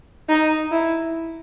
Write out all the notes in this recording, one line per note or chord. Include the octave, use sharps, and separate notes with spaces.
D#4
E4